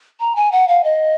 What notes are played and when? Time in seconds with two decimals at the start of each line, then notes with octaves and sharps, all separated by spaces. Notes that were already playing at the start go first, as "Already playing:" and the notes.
0.20 A#5
0.36 G#5
0.52 F#5
0.68 F5
0.84 D#5